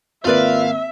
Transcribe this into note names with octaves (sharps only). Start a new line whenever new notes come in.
G#1 A#3 F4 B4 D5 E5 F5